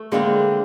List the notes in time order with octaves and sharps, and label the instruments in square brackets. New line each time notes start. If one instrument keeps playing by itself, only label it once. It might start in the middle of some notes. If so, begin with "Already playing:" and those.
Already playing: [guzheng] A3
[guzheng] D3 G3 C4 [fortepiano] G#3 A#3